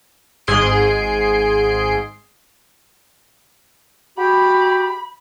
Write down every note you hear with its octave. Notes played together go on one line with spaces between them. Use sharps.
G#1 G#2 G#4 C6 C7 D7
F#4 G4 B5